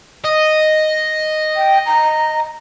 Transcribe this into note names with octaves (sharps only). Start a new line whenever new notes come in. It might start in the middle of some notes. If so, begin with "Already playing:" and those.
D#5
G5
A#5